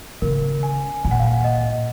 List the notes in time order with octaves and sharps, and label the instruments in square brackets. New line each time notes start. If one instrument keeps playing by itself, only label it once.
[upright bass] C#3 [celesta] A#4
[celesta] G#5
[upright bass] A#2 [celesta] G#5
[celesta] F#5
F5
F#5
D#5